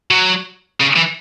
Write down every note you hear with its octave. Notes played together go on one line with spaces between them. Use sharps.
F#3
C#3
E3